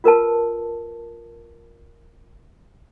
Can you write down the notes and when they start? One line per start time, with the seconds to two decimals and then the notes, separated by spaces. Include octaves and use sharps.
0.04 F4 A#4 B4 A5